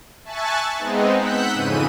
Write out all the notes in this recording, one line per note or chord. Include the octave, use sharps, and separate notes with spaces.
E5 G#5 A5 C#6 F#6 A6
G#3 B3 C4 D#4
F#5 E6 F#6 G6 B6
F2 G#2 C#3 E3 D#7